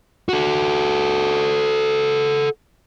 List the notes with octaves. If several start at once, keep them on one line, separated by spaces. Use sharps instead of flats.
F#4 A4